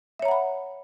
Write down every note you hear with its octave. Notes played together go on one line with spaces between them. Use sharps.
C#5 E5 F#5 A#5 B5